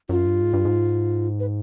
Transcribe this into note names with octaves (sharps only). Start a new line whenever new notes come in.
F#2 F4
G2
G#2
G2
G#2
B4